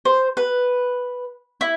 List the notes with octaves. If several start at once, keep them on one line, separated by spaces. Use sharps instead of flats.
C5
B4
E4